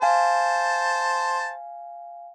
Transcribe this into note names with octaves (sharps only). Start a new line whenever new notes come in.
C5 F5 G#5 A5